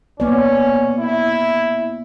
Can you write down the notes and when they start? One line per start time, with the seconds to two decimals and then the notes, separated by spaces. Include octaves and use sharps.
0.20 A#3 B3 C#4 D5
1.00 E4